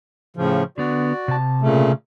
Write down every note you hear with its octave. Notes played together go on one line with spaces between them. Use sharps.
A2 C#3 F3
D3 B3 F#4 D5
C3 A5
A#2 C#3 A3